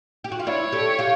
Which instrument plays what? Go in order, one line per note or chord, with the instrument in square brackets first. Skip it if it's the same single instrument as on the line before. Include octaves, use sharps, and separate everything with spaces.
[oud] G4
F#4
F4
[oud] D4 E4 [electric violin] C#5
[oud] G4 A4
F4 G4